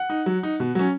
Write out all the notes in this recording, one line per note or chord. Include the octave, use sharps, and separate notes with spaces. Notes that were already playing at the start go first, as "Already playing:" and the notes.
Already playing: F#5
D#4
F#3
D#4
B2
F#3 C#4